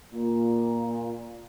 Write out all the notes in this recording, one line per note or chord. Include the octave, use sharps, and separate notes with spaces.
A#2